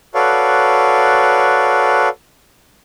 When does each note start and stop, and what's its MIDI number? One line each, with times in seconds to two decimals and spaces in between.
0.15 2.09 66
0.15 2.09 69
0.15 2.09 71
0.15 2.09 73
0.15 2.09 74
0.15 2.09 77